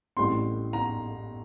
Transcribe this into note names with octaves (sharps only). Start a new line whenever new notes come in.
A1 A2 G3 C4 C6
A#5